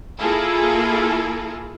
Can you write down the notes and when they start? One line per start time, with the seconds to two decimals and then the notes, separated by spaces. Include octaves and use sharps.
0.19 A#3 E4 F4 G#4 A4